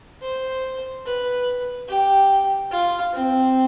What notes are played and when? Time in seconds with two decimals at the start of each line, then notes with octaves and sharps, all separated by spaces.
0.22 C5
1.05 B4
1.88 G4
2.71 F4
3.13 C4